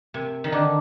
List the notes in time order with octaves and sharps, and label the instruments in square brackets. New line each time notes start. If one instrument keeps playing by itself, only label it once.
[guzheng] C3 [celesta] A#4
[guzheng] D#3
[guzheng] D3 [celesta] D#5 A#5 D6